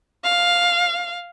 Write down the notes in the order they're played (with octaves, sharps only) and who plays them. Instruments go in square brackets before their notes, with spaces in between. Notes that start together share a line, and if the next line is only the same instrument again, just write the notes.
[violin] F5